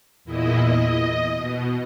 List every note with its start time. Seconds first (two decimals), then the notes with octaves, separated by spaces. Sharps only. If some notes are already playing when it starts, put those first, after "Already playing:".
0.24 E2 A#2 E4 D#5
0.64 D#5
1.34 B2